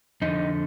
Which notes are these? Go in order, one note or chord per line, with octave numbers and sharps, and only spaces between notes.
F2 D3 D#4